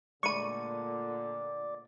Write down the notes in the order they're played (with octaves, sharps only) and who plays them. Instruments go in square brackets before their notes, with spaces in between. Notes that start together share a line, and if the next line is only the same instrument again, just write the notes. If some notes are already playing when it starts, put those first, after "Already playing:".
[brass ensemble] A#2 D3 [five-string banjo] G#3 A3 B5 [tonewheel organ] D5 [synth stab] C#6 D#7